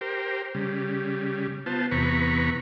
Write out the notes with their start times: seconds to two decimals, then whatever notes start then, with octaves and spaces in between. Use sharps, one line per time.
0.01 G4 A#4 C5
0.55 C#3 G3
1.66 B3 F4 C5 A5
1.91 E2 C3 B3 A#5 B5 C#6